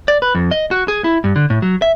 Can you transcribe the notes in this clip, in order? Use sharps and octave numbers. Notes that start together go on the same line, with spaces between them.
D5
B4
F2
D#5
F#4
G#4
E4
G2
D3
A2
F#3
E5